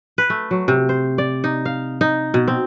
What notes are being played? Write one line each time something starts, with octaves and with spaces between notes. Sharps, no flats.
B4
A3
F#3
C3
C5
D5
D#4
F5
D#4
B2
C4